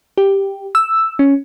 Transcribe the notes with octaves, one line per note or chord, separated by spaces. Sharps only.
G4
E6
C#4